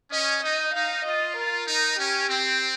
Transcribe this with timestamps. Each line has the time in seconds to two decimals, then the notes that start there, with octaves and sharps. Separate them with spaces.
0.11 C#4 D#5
0.42 D#4 D#5
0.74 D#4 F5
1.05 F4 D#5
1.36 A#4
1.67 D#4
1.98 C#4 G4
2.29 C4